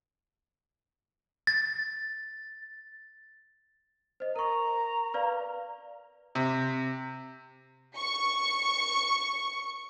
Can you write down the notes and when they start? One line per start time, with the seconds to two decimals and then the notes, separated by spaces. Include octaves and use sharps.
1.47 A6
4.20 C5 D#5
4.36 A#4 A#5 C#6
5.14 B4 D5 F5
6.35 C3
7.97 C#6 C#7